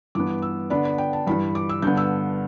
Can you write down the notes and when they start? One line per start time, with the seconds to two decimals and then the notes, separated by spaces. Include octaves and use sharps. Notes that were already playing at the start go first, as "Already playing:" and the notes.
0.15 G2 E3 B3 D6
0.42 E6
0.70 D3 B3 D4 B5
0.85 B5
0.98 G5
1.13 A5
1.27 G2 E3 G3 B5
1.55 D6
1.69 E6
1.82 G2 D3 B3 G6
1.97 E6